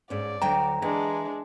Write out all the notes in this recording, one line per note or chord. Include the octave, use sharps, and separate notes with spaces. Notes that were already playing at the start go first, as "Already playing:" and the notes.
G#2 C#4 D5
D2 F#3 G5 A#5
E3 G#3 D4